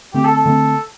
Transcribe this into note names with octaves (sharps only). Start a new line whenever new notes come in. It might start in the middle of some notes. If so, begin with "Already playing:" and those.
D3 A3 C4 G4
A4
A4
D3 A3 C4